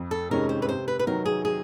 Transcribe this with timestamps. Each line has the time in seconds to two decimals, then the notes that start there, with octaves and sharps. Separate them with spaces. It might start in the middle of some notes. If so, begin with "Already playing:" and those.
Already playing: F2
0.11 A4
0.30 C3 D#3 G#3 C#4 A#4
0.49 C5
0.62 B4
0.68 C3 C5
0.88 B4
0.99 B4
1.06 D#3 F#3 A#4
1.26 G#4
1.45 G#4